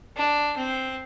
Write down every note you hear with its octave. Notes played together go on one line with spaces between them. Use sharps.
D4
C4